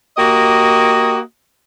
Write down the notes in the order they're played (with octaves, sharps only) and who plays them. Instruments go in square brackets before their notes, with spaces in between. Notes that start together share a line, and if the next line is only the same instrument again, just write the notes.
[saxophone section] A#3 F#4 G4 D#5